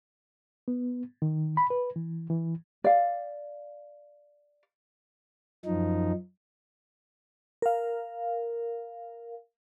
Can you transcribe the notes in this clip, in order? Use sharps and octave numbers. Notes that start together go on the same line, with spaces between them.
B3
D#3
B5
B4
E3
E3
D5 F5
F#2 F3 D#4
A#4 F5